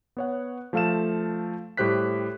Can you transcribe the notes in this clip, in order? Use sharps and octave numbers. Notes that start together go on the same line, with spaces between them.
B3 C#5 F#5
F3 A3 A4 F5 A5 E7
A2 G3 G4 C5 F#6 B6